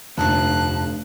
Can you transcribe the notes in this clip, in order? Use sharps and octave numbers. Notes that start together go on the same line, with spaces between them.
F1 D2 G2 F3 D4 A5 F#6